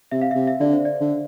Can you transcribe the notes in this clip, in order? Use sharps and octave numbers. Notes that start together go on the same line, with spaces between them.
C3 E5
F5
C3 E5
E5
D3 D5
C5
D5
D3